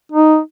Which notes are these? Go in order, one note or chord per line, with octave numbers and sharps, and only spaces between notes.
D#4